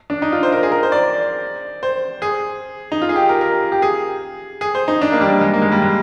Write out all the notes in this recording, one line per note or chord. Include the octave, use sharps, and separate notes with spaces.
D4
D#4
F4
C5
A#4
G#4
A#4
C5
D5
C5
G#4
D#4
F4
G#4
G4
A#4
A#4
G4
G#4
G#4
C5
D#4
D4
A#3
G3
G#3
A#3
G#3
G3
G#3